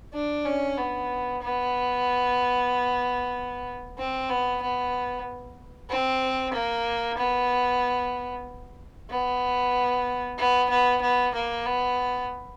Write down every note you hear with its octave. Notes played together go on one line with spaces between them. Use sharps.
D4
C#4
B3
B3
C4
B3
B3
C4
A#3
B3
B3
B3
B3
B3
A#3
B3